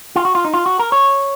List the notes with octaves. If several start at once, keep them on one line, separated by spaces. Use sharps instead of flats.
F4
F#4
F4
D#4
F4
F#4
A#4
C#5